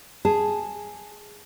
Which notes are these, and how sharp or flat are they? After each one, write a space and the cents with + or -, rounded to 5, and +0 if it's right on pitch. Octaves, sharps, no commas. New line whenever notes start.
G#4 +0 A5 +0